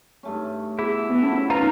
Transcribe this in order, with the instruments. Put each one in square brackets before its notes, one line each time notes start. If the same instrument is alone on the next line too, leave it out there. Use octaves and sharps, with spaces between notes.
[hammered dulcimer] G2 A3 C#4
[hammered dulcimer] B2 [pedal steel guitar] E4 [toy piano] G#4
[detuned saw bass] B3
[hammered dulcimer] F3 B3 A4 [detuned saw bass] C#4
[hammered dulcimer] D#3 D#4 [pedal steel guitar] F4 A#4 [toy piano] B4 A#5